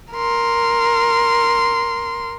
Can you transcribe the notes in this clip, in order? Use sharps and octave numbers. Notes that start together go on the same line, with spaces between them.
A#4 C6